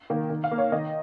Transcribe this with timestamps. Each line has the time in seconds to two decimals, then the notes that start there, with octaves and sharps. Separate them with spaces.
0.10 D#3 A#3
0.30 D#3
0.44 F5
0.51 A#3
0.58 C#5
0.72 D#3 D#5